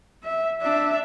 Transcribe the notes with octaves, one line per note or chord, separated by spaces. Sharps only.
E5
D4 E5